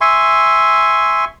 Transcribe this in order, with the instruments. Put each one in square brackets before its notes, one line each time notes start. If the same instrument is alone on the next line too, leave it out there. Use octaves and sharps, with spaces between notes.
[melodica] E5 G#5 C6 C#6